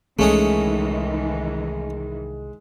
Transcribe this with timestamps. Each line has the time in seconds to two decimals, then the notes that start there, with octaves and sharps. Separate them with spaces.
0.19 C2 D#3 E3 G#3 A3 C#4 G#4